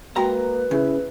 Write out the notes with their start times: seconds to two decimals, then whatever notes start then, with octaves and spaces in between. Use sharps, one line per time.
0.16 G#3 A#3 F#4 B4 G5 A#5
0.71 C#3 E4